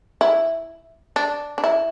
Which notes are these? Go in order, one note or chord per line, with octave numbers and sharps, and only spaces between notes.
E4
D4
D4
E4